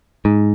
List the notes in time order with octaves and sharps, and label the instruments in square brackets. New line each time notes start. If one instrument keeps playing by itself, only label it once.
[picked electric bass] G#2